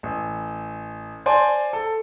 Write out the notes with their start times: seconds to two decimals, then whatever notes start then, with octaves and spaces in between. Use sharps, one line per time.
0.03 A1
1.26 C5 D5 G#5 A5 C6
1.73 A4